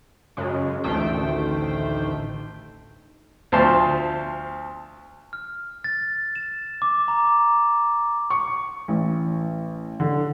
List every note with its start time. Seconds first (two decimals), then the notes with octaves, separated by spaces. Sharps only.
0.37 F#2 C#3 G#3
0.84 A1 D2 D#3 A3 C5 G5
3.52 D2 F3 C5 A5 C6
5.33 F6
5.84 A6
6.36 E7
6.82 D6
7.08 A#5
8.30 C#6
8.88 A1
10.00 D3